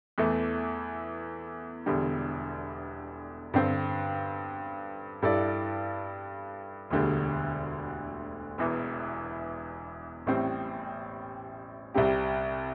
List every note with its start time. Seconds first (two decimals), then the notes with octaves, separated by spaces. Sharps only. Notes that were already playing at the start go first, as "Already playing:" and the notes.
0.18 E2 E3 A3
1.86 E1 E2 D3 G3
3.54 G2 D3 C4
5.22 G2 G3 E4 A4 D5
6.90 E1 D2 D3 G3
8.58 E1 E2 E3
10.27 A1 A2 G3 C4
11.94 C2 C3 G3 C4 G4